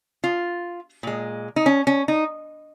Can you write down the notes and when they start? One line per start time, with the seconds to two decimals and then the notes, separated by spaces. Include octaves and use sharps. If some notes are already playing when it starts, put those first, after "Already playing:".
0.24 F4
1.03 A#2 G#3
1.56 D#4
1.66 C#4
1.87 C#4
2.08 D#4